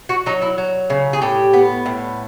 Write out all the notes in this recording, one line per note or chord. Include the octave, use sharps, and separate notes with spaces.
F#4
F#3 D#4
E4
F#3
C#3
G#4
A2 G4
B3
A2